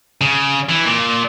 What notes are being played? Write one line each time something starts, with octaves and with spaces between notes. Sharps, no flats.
C#3
E3
A#2